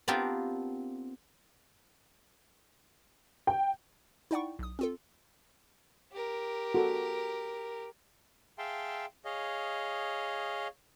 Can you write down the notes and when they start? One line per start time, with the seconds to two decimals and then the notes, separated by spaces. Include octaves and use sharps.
0.08 B3 C4 D4 F4 G4 A#4
3.47 G5
4.31 D#4 E4 D5 F#5 G5 C#6
4.59 B1 D#6
4.79 C4 F4 A4
6.12 G4 A#4
6.75 F#4 A4
8.58 G#4 E5 F5 G5 A5 C6
9.25 G#4 C#5 D#5 F5